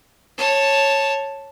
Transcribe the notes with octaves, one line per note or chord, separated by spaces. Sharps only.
C#5 A5